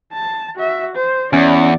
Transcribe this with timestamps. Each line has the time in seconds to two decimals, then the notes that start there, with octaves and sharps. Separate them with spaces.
0.13 A5
0.56 F#4 E5
0.96 C5
1.33 E2 C#4 D5